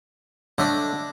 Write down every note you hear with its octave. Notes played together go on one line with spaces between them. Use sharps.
D3 A3 D4 D#5